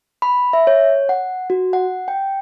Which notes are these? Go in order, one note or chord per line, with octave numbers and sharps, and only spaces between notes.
B5
E5
C#5
F#5
F#4
F#5
G5